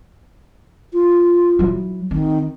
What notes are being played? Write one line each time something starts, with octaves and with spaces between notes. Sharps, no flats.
F4
F#3 E4
D#3 C4